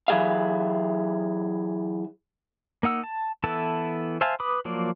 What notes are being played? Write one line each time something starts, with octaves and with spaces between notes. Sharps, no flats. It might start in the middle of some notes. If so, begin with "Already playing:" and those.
E3 F#3 G#4 E5 F5
A#3 D#4 F#5 E6
A5
E3 B3 E4 A4 A5
C5 E5 F5 G#5 A5
B4 B5 D6 D#6
F3 F#3 A#3 D5